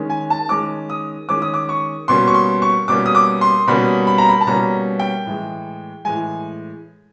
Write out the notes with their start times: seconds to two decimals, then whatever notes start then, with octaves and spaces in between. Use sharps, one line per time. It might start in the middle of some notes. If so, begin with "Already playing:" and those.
Already playing: D#3 G#3 C#4
0.10 G#5
0.30 A5
0.49 D#3 G#3 C#4 D6
0.90 D#6
1.29 D#3 G#3 C#4 D6
1.42 D#6
1.54 D6
1.69 C#6
2.08 B2 G3 A#3 C#4 C6
2.27 C#6
2.34 C6
2.62 C#6
2.88 B2 G3 A#3 C#4 D6
3.06 D#6
3.15 D6
3.41 C6
3.67 B2 G3 A#3 C#4 B5
4.07 B5
4.18 A#5
4.29 B5
4.41 A5
4.46 B2 G3 A#3 C#4 A#5
4.99 G5
5.26 A2 E3 G#3
6.05 A2 E3 G#3 G#5